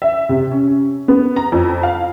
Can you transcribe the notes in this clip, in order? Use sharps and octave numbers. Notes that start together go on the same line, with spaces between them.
E5
C3
C#4
B3
A#5
F2
F5